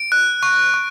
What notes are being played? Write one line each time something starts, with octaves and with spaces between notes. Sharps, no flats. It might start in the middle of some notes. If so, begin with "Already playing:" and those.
Already playing: D7
F#6
C#6
C#6